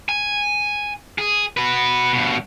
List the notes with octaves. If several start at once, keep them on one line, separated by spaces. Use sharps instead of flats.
G#5
G#4
F#4 B4
G2 B2